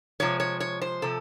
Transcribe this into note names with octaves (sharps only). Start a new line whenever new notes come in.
C3 F3 G#3 C#5
C#5
C#5
C5
C3 F3 A4